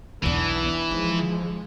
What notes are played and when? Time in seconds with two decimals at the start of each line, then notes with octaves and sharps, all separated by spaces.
0.23 B1 E2 E3 B3 D4
0.91 F3 G#3 D#4